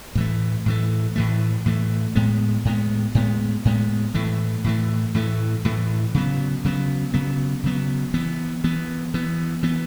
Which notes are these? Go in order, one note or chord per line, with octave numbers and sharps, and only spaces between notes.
A2 E3 A3
A2 E3 A3
A2 E3 A3
A2 E3 A3
A2 G#3 B3
A2 G#3 B3
A2 G#3 B3
A2 G#3 B3
A2 E3 A3
A2 E3 A3
A2 E3 A3
A2 E3 A3
C#3 F#3 B3
C#3 F#3 B3
C#3 F#3 B3
C#3 F#3 B3
E3 B3
E3 B3
E3 B3
E3 B3